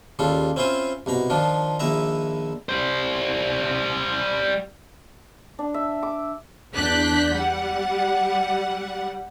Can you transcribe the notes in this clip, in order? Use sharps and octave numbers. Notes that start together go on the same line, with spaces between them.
D#2 C#3 G3 F4 A4
C4 C#4 E4 F4 C5 G#5
C2 B2 A#5 B5
D#3 F3 D4 F4
A#1 A#2 D#3 E4 E5 A#5
G3 C5
D4
E5
D6
E2 D4 F#6 G6 B6
G3 F#5